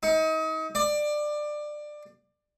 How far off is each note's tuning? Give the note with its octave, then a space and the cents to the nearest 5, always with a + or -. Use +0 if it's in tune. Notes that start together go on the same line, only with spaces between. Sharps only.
D#4 +35
D5 +20